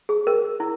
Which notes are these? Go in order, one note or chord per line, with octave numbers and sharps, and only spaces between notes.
G#4
A#4
E4